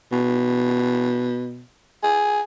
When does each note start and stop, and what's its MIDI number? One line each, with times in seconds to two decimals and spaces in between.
0.12 1.65 47
2.03 2.41 68